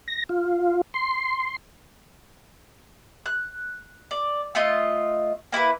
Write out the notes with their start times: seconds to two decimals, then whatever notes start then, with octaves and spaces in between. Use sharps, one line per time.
0.08 A#6
0.29 F4
0.94 C6
3.26 F#6
4.11 D5
4.55 A3 F4 D#5
5.52 A#3 E4 A4 B4